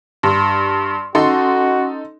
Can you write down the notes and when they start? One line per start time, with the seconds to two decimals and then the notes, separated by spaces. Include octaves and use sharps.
0.23 G2 C6
1.15 C#4 D#4 F#4 A4 C6